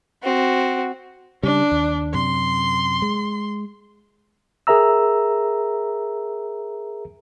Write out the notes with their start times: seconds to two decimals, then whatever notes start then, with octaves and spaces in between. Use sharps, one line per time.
0.24 C4 F#4
1.43 C#3 G3 D4
1.72 D#2
2.14 F#2 C3 C6
3.02 G#3
4.67 G#4 A#4 E5 A#5 E6